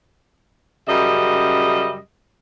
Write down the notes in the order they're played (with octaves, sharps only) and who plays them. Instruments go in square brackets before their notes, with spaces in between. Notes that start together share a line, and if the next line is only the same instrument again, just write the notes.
[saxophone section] F#2 C#3 G3 D#5 E5